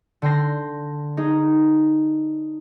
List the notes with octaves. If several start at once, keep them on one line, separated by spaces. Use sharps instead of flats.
D3 G5 C6 A#6
D#4 G#4